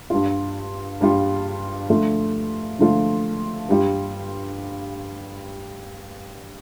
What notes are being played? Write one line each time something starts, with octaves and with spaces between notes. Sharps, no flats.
G2 G3 F4
G2 G3 F4
D3 F3 A3 F4
D3 F3 A3 F4
G2 G3 F4